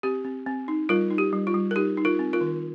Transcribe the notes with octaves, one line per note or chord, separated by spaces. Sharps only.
C4 G4
C4
C4
D#4
G3 F4 A#4
D#4
G4
G3
F4
G3
A#4
D#4 G4
D#4
F4 A#4
C4
F4 A#4
D#3